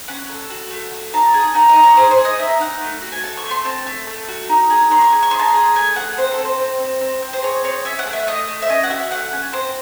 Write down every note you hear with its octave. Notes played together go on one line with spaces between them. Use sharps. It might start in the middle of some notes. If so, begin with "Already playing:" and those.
C#4 F#5
A4
F#4
A3
F#4
D#4 A5
G#4
D#4 F#5
D#5
D#4
C#5
G#4 C5
C5
G#4
D#5
D#4 E5
D#4 F#5
A3
F#4
G#5
A4 A5
C#6
A3
C6
C4 A5
A3
A3
F#4
D#4
G#4
D#4 C6
C#6
G#4
C#6
D#4 C6
A5
C6
G#4
A3 G#5
G#4 F#5
C4 C5
A4
C4
C5
C4
C4
C4
C4
C5
G#4 C#5
C4 C#5
C#4 E5
F#5
A3
E5
A3 D#5
A3
E5
C#4 D#5
F#5
F#4 E5
A3 F#5
C#4
C4 C5